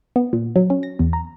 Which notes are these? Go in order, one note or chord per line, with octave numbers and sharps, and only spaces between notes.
B3
A#2
F#3
C#4
A#6
E2
A#5